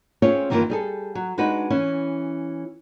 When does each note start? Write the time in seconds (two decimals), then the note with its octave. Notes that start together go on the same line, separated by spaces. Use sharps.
0.22 C4 C#4 F4 G#4 C#5
0.50 G2 D#3 E3 A3 A#3 F4
0.70 G3 G#4 A4
1.15 F#3
1.38 G#3 D4 D#4 F#4 B4
1.70 E3 C#4 E4